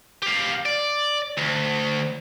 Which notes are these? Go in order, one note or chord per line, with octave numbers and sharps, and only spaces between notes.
G4 F5
D5
D2